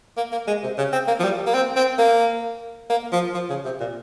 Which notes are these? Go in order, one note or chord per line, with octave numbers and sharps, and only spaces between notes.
A#3
A#3
G#3
C3
C#3
C4
A#3
F3
G3
A#3
C4
C4
A#3
A#3
F3
F3
C#3
C3
A#2